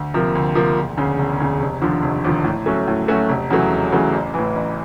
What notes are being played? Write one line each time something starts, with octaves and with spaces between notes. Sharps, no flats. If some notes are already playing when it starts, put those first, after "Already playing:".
Already playing: D2
C3 F3 A#3
D2
C3 F3 A#3
E1
D2 C#3
E1
D2 C#3
F1
D#2 D3 F3
F1
D#2 D3 F3
A2
F#3 A3 C#4 F#4
A2
F#3 A3 C#4 F#4
F1
E2 C#3 F#3 A3
F1
E2 C#3 F#3 A3
A1
A2 E3
A1